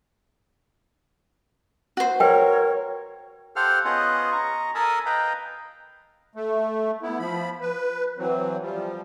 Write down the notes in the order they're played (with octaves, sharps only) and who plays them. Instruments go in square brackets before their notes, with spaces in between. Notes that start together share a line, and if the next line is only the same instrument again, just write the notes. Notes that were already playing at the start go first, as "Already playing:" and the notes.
[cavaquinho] F#4 C5
[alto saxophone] A#4 [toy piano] B4 G5 [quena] C#5
[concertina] G4 A4 C5 F5 F#5 F6
B3 C#4 F4 G#4 D#5 F#5
D#5 A#5 C#6
A4 A#4 G#5 A5 B5 D#6
B4 D#5 F5 G5 A#5 B5
[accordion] A3
B3 E4
F3 B5
B4
E3 F#3 C4
F3 G3